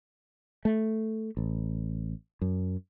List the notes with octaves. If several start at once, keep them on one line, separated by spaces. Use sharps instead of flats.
A3
A1
F#2